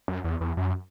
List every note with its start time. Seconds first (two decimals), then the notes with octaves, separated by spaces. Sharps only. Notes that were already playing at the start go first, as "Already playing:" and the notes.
0.08 F#2
0.24 E2
0.41 E2
0.57 F#2